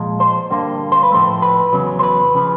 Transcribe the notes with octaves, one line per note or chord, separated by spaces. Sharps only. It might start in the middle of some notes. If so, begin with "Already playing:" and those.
Already playing: A#2 F3 G#3
C5
G2 D3 G3 A#3
C5
B4
A2 F3 A3 C5
B4
E2 C#3 F#3
C5
B4
C#3 F3